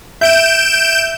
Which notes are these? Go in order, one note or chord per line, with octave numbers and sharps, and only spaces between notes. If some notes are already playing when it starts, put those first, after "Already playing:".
E5 G6 D7 E7